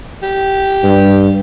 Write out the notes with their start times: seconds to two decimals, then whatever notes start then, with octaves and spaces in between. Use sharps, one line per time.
0.23 G4
0.84 G2